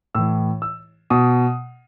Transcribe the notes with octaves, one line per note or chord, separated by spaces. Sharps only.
A2 E3 E6
E6
B2 D#6